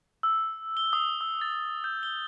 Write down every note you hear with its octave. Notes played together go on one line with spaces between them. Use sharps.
E6
G7
D#6
E6
A6
G6
G7